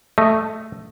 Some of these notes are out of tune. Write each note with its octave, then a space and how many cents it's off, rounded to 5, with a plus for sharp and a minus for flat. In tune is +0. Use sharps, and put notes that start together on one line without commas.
A3 +0 D#5 +0